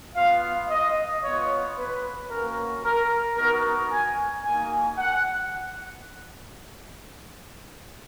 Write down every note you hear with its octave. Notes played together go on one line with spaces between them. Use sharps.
B3 F4 F5
D#5
B3 F4 C#5
B4
A#3 C#4 F#4 A#4
A#4
B3 D#4 F#4 A#4
G#5
A#3 D#4 F#4 G#5
F#5